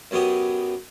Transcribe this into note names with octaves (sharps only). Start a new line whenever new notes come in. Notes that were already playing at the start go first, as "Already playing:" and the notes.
F#2 F#3 B3 G4 D#6